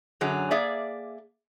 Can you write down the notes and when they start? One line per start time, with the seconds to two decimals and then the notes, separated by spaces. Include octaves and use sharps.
0.21 F#2 D3 F#3 G#4
0.51 A#3 G#4 D5 E5